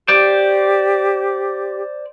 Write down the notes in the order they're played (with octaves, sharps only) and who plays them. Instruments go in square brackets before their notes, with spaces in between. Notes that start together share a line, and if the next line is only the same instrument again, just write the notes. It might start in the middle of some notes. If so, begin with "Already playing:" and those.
[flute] G4 [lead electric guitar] C5 D5